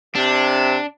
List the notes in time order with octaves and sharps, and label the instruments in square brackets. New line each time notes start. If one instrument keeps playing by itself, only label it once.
[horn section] C3 [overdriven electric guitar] D4